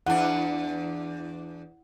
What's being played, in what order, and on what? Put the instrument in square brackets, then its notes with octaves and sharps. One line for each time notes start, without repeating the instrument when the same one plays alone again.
[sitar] E2 D4 [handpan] E4 F#5